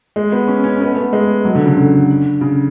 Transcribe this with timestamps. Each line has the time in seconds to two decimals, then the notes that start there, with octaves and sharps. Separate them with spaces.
0.16 G#3
0.32 B3
0.48 C#4
0.64 C#4
0.81 B3
0.88 A3
0.97 B3
1.13 G#3
1.45 F#3
1.55 D3
1.66 C#3
1.77 D3
2.41 C#3